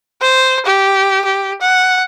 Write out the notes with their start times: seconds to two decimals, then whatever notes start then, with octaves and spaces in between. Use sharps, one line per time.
0.22 C5
0.66 G4
1.25 G4
1.61 F#5